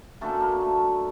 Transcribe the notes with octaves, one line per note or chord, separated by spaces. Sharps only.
F#2 D3 F#3 A3 A#3 A4
A#3 A#4
A3 A4